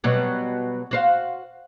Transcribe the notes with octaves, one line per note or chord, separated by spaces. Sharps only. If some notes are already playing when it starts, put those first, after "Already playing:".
B2 F#3 G3
F#4 C5 F5